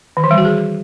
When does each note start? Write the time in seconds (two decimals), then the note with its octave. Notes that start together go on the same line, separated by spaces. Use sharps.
0.17 D#3
0.24 E3
0.31 G3
0.38 F#4
0.45 G#4